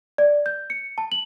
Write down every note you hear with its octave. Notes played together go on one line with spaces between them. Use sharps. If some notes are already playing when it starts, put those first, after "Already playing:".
D5
G6
C#7
A5
F#7